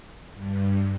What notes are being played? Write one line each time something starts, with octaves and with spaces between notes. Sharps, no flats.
G2